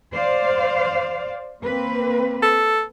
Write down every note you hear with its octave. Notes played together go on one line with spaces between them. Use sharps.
C5 D5 F5
A#3 C4 B4
A4